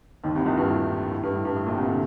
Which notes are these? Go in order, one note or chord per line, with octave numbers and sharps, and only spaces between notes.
D#2 D#3
C2 C3
A#1 A#2
G2
A2
A2
G2
A2
G2
A2
A#1 A#2
C2 C3
D3